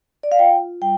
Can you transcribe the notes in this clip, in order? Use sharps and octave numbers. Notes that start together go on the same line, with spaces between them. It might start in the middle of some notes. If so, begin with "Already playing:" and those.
D5
F5
F4 G5
G3 G5